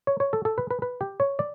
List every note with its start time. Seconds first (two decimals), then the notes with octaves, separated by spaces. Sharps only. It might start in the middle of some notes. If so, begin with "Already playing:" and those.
0.07 C#5
0.20 C#5
0.33 A4
0.45 A4
0.58 B4
0.71 B4
0.82 B4
1.01 G4
1.20 C#5
1.39 D5